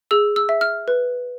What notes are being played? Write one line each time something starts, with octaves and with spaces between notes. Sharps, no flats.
G#4 E6
E6
E5
F6
B4